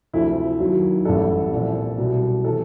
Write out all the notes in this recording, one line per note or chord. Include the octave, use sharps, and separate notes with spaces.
D2 C3 F3 E4
D#2 D#3 F#3
A1 A2 E3 G3 A4
C2 A#2 F3
C2 B2 G3
C3 E3 A4